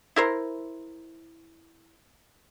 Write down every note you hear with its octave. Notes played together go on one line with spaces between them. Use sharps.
E4 A#4 C5